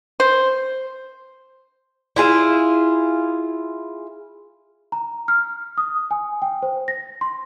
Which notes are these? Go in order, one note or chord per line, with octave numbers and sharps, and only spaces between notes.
C5
E4 F4 G#4 E5
A#5
F6
D#6
G#5
G5
C5
A#6
C6